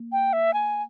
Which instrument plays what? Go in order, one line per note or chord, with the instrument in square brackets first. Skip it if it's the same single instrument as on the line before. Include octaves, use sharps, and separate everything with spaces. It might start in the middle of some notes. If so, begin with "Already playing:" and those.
Already playing: [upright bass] A#3
[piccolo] G5
E5
G#5